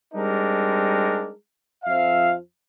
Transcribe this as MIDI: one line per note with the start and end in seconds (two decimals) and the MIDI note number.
0.14 1.31 55
0.14 1.31 56
0.14 1.31 60
0.14 1.31 62
0.14 1.31 63
0.14 1.31 70
1.84 2.34 41
1.84 2.34 53
1.84 2.34 76
1.84 2.34 77